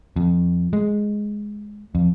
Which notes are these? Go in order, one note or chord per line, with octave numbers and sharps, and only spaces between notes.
F2
G#3
F2